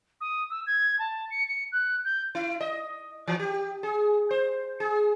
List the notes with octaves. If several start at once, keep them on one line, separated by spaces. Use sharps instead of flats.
D#6
E6
G#6
A5
C#7
C#7
F#6
G6
E4
D#5
E3
G4
G#4
C5
G#4